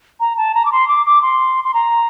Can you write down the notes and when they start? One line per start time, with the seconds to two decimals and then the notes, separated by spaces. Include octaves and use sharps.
0.20 A#5
0.37 A5
0.54 A#5
0.65 D6
0.72 C6
0.88 D6
1.06 D6
1.22 C6
1.64 C6
1.74 A#5